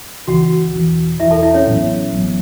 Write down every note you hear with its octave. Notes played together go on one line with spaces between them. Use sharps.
C#2 C#3 E3 F#4 F#5
E1 E2 E3
E1 E2 E3 E4 E5
A4 A5
E4 E5
C#4 C#5
A1 A2 F#3 B3
A1 A2 F#3 B3